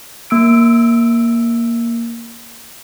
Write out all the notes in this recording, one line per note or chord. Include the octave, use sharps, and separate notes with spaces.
A#3 E6 D7